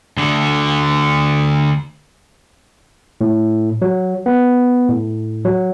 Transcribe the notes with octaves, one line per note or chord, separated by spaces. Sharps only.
D2 D3
A2
F#3
B3
A2
F#3